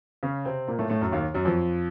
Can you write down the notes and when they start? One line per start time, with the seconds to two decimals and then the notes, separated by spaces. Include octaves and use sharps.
0.23 C#3 C#4
0.45 C3 C4
0.68 A#2 A#3
0.79 A2 A3
0.89 A2 A3
1.01 F#2 F#3
1.12 D#2 D#3
1.34 F#2 F#3
1.45 F2 F3